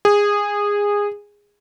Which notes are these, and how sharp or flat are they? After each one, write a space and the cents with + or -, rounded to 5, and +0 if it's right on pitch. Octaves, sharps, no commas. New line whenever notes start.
G#4 -20